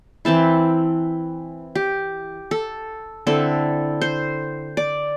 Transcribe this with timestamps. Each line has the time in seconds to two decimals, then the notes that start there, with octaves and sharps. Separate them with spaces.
0.25 E3 C4 E4 A5
1.75 G4
2.51 A4
3.27 D3 C4 E4 A4
4.02 C5
4.77 D5